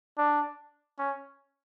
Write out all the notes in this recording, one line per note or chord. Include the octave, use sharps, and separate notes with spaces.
D4
C#4